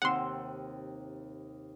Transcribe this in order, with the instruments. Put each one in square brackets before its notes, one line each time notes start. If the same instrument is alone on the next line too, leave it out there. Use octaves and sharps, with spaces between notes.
[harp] D#2 C3 E6 [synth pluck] F#5 C6